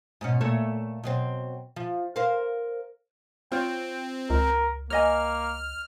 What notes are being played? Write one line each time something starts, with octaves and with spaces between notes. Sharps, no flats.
G#2 B2 C#4
A#2 A3 C#5
B2 F#3 C4
F3
A#4 C5 F5
C4 F4 C#5 G5
C#2 A#4
A#3 C#5 D#5 G#5 F6